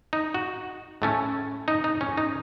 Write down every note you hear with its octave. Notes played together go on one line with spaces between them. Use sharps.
D#4
F#4
A2 A3 C#4
D#4
D#4
C#4
D#4